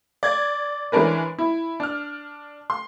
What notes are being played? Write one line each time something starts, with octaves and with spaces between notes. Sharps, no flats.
D5 G#6
E3 G#3 C#4 D4 A#4 B4
E4
D4 F6
C6